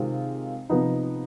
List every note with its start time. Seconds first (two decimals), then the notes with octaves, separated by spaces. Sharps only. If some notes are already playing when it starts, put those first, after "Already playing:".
Already playing: C3 D#3 G#3 C4 F4
0.70 C3 F3 B3 D#4